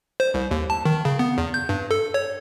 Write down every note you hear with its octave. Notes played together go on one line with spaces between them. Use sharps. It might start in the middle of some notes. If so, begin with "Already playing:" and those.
C5
C2
D#2
A5
D#3
C#3
B3
E2
G6
G2
A4
C#5